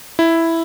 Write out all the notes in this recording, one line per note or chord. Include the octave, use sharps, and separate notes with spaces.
E4